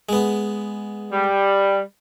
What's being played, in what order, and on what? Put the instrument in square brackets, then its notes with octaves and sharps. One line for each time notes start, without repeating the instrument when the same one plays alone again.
[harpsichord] G#3 B3
[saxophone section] G3